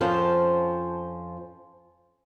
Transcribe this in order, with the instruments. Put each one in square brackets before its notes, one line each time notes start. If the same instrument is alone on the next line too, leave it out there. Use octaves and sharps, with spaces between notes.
[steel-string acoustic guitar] F2 F3 C#4 C5 A5